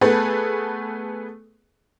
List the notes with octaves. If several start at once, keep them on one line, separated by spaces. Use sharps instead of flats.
A3 B3 G#4 A4 B4